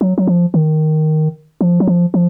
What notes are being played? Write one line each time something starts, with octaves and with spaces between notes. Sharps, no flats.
F#3
F#3
F3
D#3
F3
F#3
F3
F3